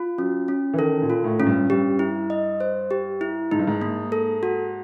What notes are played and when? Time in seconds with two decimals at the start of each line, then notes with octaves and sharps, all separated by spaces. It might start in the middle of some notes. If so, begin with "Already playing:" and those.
Already playing: F4
0.18 F#3 C#4
0.48 C#4
0.73 E3
0.78 D#3 A4
1.02 A#2
1.10 F4
1.24 A2
1.40 G#2 C#4
1.47 G2
1.70 G2 G4
1.99 E4
2.30 D#5
2.60 C5
2.91 G4
3.21 E4
3.51 G#2 D#4
3.60 G2
3.67 G#2
3.81 A#3
4.12 A4
4.43 F#4